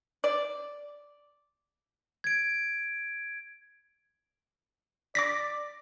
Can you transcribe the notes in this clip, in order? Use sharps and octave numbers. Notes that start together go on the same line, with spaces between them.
D5
G#6 D7
D5 D6 A#6 B6